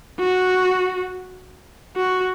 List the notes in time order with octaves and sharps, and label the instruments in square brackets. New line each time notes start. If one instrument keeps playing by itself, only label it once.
[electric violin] F#4
F#4